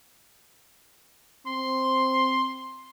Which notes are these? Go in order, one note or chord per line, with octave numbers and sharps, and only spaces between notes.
C4 C6